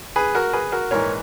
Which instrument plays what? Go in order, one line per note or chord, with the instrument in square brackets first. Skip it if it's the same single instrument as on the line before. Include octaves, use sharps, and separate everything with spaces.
[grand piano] G#4 B4
F#4 A#4
G#4 B4
F#4 A#4
A#1 G#2 E3 A#4 C#5